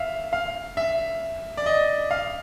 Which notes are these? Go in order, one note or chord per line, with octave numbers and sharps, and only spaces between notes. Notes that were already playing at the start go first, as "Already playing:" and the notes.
Already playing: E5 F5
F5
E5
D5
D#5
F5